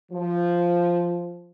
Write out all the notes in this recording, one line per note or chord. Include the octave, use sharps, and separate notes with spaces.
F3